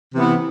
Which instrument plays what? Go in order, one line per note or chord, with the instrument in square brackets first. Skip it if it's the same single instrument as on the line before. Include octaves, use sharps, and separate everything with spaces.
[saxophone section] C3 E3 B3 E4